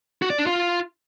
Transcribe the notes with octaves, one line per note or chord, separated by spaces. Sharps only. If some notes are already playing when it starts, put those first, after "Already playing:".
F#4
D5
D4
F4